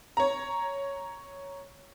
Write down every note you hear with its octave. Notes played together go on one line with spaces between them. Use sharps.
C#5 A#5